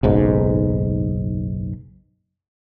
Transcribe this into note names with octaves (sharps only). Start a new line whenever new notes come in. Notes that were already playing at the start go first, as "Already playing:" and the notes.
F#1 B1 G#2